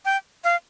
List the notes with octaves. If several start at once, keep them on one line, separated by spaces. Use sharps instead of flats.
G5
F5